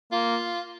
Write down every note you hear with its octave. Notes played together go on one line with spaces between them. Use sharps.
A#3 F4